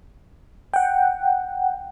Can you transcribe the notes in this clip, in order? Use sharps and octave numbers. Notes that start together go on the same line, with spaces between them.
F#5 G5